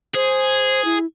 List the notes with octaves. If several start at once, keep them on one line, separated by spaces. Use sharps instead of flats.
G#4 C5
E4